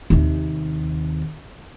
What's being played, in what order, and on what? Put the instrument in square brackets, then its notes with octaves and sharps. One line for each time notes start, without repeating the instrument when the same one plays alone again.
[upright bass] D#2 C3